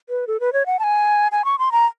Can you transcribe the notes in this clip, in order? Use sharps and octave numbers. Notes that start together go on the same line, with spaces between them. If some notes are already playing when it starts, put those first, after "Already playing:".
B4
A4
B4
C#5
F#5
A5
G#5
G#5
C#6
C6
A#5